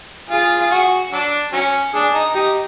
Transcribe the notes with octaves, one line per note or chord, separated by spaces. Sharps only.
F4 G#4
F4
F#4
F#3 D4
F#3 C#4
D4 G#4
D#4
D#4 G4